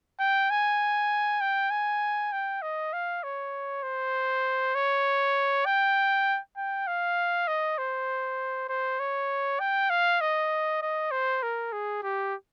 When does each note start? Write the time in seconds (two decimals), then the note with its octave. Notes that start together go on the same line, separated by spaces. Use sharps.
0.20 G5
0.50 G#5
1.41 G5
1.70 G#5
2.32 G5
2.62 D#5
2.93 F5
3.23 C#5
3.83 C5
4.75 C#5
5.66 G5
6.57 G5
6.87 F5
7.47 D#5
7.78 C5
8.69 C5
8.99 C#5
9.59 G5
9.90 F5
10.21 D#5
10.82 D#5
11.11 C5
11.42 A#4
11.72 G#4
12.03 G4